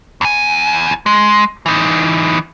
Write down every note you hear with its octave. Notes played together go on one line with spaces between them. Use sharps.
E2 G#5
G#3
E3 D#4